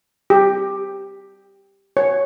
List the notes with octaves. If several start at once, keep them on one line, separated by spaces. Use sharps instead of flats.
G4
C#5